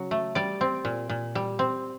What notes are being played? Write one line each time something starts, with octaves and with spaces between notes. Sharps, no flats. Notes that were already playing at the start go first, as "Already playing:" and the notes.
Already playing: C#3 F#3
A3
G3 D5
C4
A#2
A#2
G3
C4